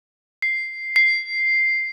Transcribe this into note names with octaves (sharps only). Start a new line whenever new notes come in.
C7
C7